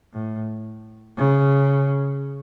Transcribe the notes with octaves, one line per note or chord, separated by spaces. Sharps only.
A2
C#3